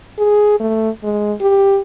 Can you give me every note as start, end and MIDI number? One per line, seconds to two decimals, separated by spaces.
0.18 0.56 68
0.60 0.90 57
1.04 1.33 56
1.41 1.79 67